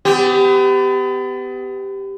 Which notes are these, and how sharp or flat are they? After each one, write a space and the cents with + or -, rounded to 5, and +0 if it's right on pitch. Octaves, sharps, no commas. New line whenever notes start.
B3 +35 G4 +0